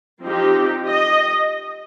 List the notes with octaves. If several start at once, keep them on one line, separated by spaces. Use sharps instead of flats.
F3 C4 D#4 G4
D#5